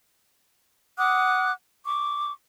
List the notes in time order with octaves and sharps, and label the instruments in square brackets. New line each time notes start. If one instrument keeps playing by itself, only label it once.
[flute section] F#5 D6 D#6 F#6
C#6 D6